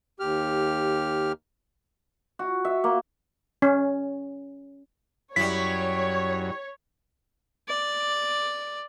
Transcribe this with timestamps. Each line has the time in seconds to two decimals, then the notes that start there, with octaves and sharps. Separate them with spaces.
0.20 D#2 G4 F6
2.39 F#4
2.65 E5
2.84 A#3
3.62 C#4
5.36 F#2 G3 E4 C#5 B6
7.68 D5